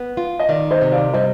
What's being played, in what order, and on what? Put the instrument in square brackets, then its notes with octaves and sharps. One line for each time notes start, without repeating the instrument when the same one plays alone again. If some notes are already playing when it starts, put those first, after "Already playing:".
Already playing: [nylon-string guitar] B3
F4
[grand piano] D#5
[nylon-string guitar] D#3 [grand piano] D5
[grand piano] C5 D#5
[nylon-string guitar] C3
[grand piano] D5 F5
[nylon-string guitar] G3 [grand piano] C5 D#5